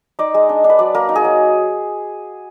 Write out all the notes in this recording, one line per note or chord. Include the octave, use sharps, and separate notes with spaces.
D#4 D5
G#3
D4
D4
B4
F#3 D5
A#3 A#4
D#4
G#4
F#3